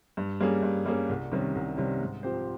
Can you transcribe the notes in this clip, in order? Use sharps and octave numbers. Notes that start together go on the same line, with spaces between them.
G2
G3 A#3 C#4 G#4
G2
G3 A#3 C#4 G#4
C2
C3 D#3 G3 C#4
C2
C3 D#3 G3 C#4
G#2
F3 C4 G4 C5